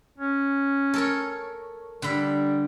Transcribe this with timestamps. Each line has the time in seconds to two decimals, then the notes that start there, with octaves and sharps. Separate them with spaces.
0.18 C#4
0.94 A4 A#4 C#5
2.02 D3 G3 B5